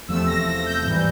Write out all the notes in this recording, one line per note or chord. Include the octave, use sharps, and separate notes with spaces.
E2 C3 F3 A3 E6
A#6
A#6
G6
G#2 E3 G3